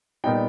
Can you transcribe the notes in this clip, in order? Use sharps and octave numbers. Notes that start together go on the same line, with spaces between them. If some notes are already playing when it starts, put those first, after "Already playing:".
A#2 G3 B3 D#4 G5